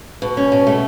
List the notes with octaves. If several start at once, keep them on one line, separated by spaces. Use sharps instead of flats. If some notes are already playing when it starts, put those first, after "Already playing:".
B2
C#4
B2
A3